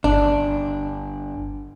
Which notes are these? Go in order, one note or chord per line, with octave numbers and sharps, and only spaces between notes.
G1 D4